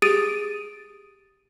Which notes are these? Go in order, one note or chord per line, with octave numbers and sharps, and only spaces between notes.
G4 G#4 D#6 A6 D7 D#7